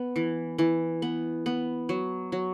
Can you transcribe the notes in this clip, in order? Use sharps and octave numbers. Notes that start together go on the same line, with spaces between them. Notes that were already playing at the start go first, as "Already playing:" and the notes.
Already playing: B3
E3
E3
B3
B3
F#3
F#3